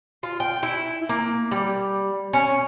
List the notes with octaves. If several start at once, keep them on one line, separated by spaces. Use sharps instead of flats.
F4
G5
E4
A#3
G3
C#4